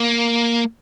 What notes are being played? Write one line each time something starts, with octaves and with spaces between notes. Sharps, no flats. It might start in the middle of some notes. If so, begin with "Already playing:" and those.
Already playing: A#3